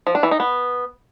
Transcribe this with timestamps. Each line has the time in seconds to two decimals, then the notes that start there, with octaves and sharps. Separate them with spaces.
0.07 F3
0.15 D4
0.23 E3
0.31 D#4
0.40 B3